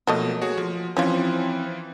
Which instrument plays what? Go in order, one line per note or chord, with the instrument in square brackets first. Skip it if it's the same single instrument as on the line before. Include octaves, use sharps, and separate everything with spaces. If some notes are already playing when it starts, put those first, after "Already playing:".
[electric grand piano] B2 F3 [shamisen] F#3 A3 D#5 [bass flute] A#3
[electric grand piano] F#4 G#4 C#5
[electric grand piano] F3 [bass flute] F4
[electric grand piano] E3 F3 E4 [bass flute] C4 [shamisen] C#4 F4